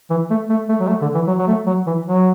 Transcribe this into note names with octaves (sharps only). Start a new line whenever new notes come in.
E3
A3
A3
A3
F#3
A3
D3
E3
F#3
F#3
A3
F#3
E3
F#3